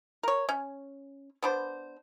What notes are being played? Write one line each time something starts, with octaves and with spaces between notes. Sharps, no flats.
A#4 C#5
C#4
B3 D4 C5